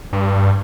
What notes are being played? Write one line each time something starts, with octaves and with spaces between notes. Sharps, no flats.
G2